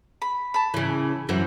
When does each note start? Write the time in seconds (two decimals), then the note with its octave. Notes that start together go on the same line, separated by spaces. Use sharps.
0.22 B5
0.54 A5 B5
0.74 C#3 E3
1.29 F#2 E3 C5 F#5